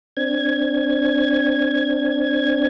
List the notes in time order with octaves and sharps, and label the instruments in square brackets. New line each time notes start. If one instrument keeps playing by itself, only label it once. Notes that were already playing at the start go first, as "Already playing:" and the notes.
[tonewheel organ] C4 D4 G#6